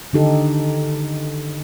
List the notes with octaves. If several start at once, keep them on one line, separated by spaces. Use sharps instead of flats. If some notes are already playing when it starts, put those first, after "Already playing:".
D3 D#3 D#4 G4 A4